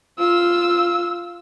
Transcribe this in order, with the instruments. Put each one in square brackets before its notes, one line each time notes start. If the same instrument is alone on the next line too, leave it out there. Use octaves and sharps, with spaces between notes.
[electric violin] F4 E6